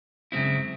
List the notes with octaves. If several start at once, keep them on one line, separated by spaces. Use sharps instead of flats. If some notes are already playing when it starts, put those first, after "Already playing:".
F#2 C#3 G#3 C4 E4